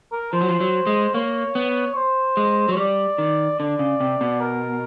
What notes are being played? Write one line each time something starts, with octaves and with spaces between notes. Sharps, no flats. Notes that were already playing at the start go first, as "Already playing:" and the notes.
A#4
F3 C5
F#3
F3
F#3
G#3
A#3 C#5
B3
C5
G#3
F#3
C#5
G3 D5
D#3
D3 D5
C#3
C3
B2
A#4